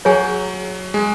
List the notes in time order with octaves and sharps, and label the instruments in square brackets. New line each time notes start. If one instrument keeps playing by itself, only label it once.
[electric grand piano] F#3 [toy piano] G#4 C#5 G#5
[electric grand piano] G#3